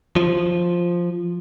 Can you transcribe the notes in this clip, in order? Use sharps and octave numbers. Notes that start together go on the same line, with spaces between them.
F3